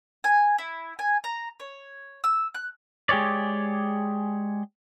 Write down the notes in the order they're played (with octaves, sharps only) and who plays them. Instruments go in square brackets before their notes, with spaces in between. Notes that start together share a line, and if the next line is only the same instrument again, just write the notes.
[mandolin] G#5
E4
G#5
A#5
C#5
E6
F#6
[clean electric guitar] G#3 G4 G#4 C#5 D5